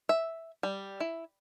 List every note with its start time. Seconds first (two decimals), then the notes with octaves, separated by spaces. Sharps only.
0.09 E5
0.63 G3
1.00 E4